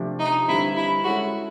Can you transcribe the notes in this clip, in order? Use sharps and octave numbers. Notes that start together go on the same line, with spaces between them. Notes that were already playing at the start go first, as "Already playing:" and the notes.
Already playing: C3 F3 A3 D4
D#4
G2 D3 G3 C4 E4
E4
G#3 C#4 E4 F#4 A4